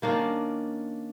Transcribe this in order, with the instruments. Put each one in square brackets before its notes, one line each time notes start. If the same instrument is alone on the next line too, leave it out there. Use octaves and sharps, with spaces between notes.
[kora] D#3 A#3 C#4 D4